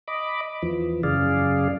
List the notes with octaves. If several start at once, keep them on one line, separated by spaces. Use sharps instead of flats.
D#5 B5 D6
E2 E3 F3
F#2 C#3 G#4 D5 F5